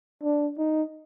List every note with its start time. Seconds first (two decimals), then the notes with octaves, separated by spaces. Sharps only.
0.23 D4
0.58 D#4